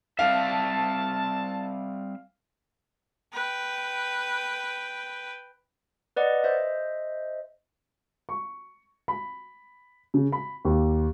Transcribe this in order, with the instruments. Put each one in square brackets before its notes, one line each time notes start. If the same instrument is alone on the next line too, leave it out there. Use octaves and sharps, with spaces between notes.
[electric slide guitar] G3 C4 E5 [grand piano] F5 [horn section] A5
[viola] B4 G5
[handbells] B4 D5 D#5 F#5
C5 D#5 E5
[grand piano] C#6
B5
C#3
B5
D#2